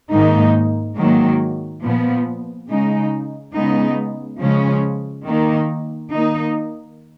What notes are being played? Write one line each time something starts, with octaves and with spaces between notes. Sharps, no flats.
G#2 D#3 A#3 D#4
G#2 D#3 F#3 A#3
A#2 F3 B3
C#3 G#3 D#4
C#3 G#3 B3 D#4
C#3 F3 G#3 C#4
D#3 A#3 D#4
D#3 A#3 D#4